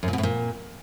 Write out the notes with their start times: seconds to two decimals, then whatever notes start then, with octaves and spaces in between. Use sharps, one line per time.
0.03 F#2
0.08 A#2
0.13 B2
0.18 A2
0.23 A#2